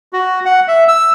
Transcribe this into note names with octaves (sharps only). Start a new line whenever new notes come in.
F#4
F#5
E5
E6